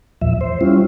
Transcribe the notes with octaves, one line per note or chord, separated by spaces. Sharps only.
E2 A#2 F3 E5
C5
G3 C#4 E4 F4